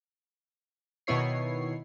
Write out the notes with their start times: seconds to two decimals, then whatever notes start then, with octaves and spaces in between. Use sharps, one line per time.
1.07 B2 D#3 B3 E4 C#5 C7